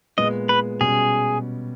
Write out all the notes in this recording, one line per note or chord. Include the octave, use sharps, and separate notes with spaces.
A#2 G#3 B3 D#5
B4
B2 G3 C#4 G#4